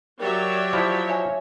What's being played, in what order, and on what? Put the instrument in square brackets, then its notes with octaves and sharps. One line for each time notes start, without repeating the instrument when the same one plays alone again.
[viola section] F#3 C#5 E5 [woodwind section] G4 D5 [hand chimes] A#4
[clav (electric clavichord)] F3 E4 [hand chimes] B6
[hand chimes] C#5 E5 G#5